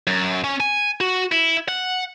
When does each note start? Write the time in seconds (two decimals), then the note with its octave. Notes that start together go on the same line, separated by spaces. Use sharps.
0.07 F#2
0.44 C#4
0.60 G#5
1.01 F#4
1.32 E4
1.69 F#5